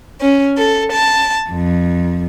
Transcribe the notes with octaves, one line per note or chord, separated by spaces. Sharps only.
C#4
A4
A5
F2